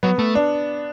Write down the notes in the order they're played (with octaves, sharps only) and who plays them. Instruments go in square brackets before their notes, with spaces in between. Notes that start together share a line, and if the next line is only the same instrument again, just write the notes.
[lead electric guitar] F#3 [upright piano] B3
[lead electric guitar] A3
[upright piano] D4